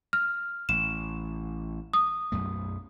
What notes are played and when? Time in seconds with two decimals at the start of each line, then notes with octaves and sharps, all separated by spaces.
0.13 F6
0.69 A1 E7
1.94 D#6
2.32 B1 F#2 A3